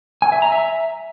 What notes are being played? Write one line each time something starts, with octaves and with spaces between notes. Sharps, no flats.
G#5
E5
A#5
E5